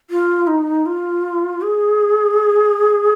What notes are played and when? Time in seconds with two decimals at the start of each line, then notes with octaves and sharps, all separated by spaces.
0.10 F4
0.47 D#4
0.86 F4
1.62 G#4